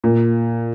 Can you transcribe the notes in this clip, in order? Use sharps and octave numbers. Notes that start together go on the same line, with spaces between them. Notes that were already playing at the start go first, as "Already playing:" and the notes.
A#2